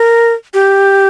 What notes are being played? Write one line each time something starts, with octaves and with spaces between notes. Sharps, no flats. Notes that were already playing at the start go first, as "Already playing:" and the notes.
Already playing: A#4
G4